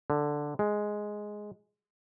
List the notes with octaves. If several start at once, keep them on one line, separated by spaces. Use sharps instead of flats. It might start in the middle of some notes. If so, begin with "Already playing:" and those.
D3
G#3